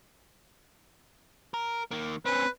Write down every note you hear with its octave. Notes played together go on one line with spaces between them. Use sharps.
A#4
D#3 A#3
C4 C#4 B4